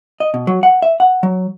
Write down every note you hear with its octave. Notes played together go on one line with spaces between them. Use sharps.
D#5
B2
F#3
F#5
E5
F#5
F#3